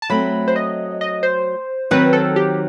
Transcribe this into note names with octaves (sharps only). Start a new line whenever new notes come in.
A5
F#3 A3 C4 B5
C5
D#5
D#5
C5
D#3 F#3 C4 B4
A4
G4